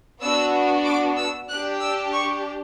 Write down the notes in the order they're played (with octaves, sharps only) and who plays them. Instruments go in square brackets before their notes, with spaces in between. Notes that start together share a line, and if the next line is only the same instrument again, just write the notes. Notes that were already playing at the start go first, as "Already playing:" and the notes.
[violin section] B3 D4 F#4 E6
D6
E6
D4 G4 F#6
E6
C#6